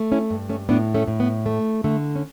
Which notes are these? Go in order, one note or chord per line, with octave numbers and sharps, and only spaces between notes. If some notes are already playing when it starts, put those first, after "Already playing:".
Already playing: A3
C#4 E4
G2
A3 C#4
A2 B3 D4
A3 C#4
A2
B3
A3
D3 A3
C#4